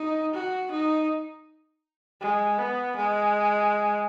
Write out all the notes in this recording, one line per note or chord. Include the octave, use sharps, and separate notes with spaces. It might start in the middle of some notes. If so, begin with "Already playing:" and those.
Already playing: D#4
F#4
D#4
G#3
B3
G#3